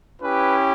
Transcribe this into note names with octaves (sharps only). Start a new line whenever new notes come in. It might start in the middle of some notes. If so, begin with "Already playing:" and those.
C#4 E4 G4 B4